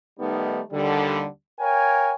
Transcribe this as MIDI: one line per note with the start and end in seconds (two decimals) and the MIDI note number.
0.19 0.60 51
0.19 0.60 55
0.19 0.60 57
0.19 0.60 59
0.19 0.60 63
0.72 1.26 39
0.72 1.26 50
0.72 1.26 55
1.59 2.14 70
1.59 2.14 73
1.59 2.14 77
1.59 2.14 79
1.59 2.14 80